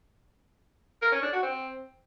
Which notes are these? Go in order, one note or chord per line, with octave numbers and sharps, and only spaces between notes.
A#4
C#4
D4
F#4
C4